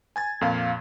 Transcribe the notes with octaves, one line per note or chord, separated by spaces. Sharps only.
G#5 G#6 A6
F2 A#2 F5